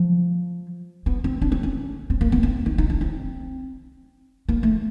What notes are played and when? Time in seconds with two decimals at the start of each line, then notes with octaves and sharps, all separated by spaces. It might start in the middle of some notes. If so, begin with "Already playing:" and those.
Already playing: F3
1.06 B3
1.24 C4
1.42 D4
1.52 C4
1.63 C#4
2.10 C4
2.21 A#3
2.32 B3
2.43 C4
2.66 D#4
2.78 D#4
2.90 D4
3.01 C4
4.49 A#3
4.63 A3